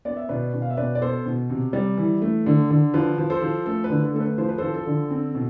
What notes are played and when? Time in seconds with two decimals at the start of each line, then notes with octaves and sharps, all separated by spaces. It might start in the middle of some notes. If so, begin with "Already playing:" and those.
0.05 B3 D5
0.17 E5
0.29 B2 B4 D5
0.54 B2
0.62 F5
0.70 E5
0.77 B2 B4 D5
0.95 D5
1.01 B3 A4 C5
1.26 B2
1.50 C3
1.73 G3
1.97 E3
2.22 A3
2.46 D3
2.70 D3
2.94 F3 B4
3.18 F3
3.30 A4 C5
3.42 F3
3.66 A3 A4
3.84 B4
3.90 D3
4.02 A4
4.14 A3 A4
4.20 B4
4.38 F3 C5
4.49 B4
4.58 F3 A4 C5
4.74 A4
4.86 D3
5.11 C4
5.35 B2